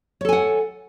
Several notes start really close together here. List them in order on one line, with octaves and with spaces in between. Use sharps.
C#5 A4 G#5 F#5